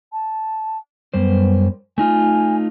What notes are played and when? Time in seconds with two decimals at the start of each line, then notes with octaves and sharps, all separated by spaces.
0.13 A5
1.14 F#2 G3 B3 C5
1.98 A3 D#4 F4 G#5